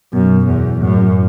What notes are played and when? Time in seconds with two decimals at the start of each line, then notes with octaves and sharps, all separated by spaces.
0.13 F#2 B2
0.47 E2
0.81 F#2 A2